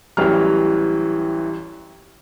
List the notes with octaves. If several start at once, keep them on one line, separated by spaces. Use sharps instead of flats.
A1 E3 F#3 G3 F6